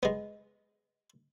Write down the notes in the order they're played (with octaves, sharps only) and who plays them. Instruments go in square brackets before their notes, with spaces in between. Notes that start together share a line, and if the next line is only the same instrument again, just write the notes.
[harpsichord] G#3 B3